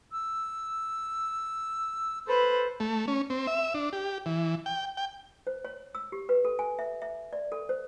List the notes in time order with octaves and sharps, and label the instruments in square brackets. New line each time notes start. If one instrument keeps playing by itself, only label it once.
[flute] E6
[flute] A4 [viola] B4 C5
[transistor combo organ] A3
C#4
C4
E5
D4
G4
E3
G5
G5
[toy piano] C5
C#5
E6
G4
B4
A4
G#5
E5
E5
D5
A4
C5